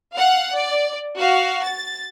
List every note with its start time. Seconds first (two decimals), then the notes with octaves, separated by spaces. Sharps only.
0.14 F5 F#5
0.54 D5
1.17 F#4 F5
1.62 A6